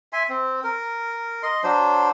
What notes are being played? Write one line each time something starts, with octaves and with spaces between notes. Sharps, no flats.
E5 G#5 C6
C4
A#4
D#5 C6
F#3 D4 C5